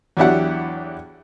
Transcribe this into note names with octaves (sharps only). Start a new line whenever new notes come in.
E2 F#3 D4 E4 G4 F#5